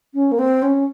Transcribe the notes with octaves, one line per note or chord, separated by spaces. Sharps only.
C#4
A#3
C4
C#4